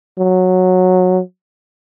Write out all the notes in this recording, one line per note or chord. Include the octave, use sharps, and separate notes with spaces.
F#3